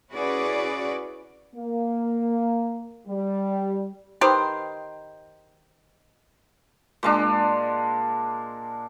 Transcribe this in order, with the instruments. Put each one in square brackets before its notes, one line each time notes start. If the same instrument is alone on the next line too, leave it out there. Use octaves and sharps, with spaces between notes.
[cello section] C#4 E4 F#4 G#4 B4 D5
[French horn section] A#3
G3
[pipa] D#3 G4 B4 C5
[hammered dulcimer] A#2 G#3 D4